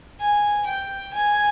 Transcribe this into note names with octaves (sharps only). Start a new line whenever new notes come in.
G#5
G5
G#5